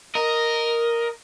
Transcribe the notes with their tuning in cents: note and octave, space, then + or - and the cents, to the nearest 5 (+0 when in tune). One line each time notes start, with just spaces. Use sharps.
A#4 +0 D#5 +0